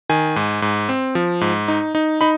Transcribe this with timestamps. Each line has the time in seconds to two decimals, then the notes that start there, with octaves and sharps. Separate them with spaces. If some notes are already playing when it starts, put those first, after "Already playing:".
0.10 D#3 G#5
0.36 G#2
0.62 G#2
0.89 C4
1.15 F3
1.41 G#2
1.68 D#4
1.95 D#4
2.21 D#4 B5